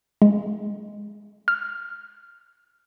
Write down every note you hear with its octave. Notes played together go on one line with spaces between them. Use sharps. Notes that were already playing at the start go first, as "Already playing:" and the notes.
G#3
F6